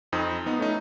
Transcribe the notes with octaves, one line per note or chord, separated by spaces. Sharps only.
F2 C4 D#4 D#6
B3 D#4
A3 C#4 D#4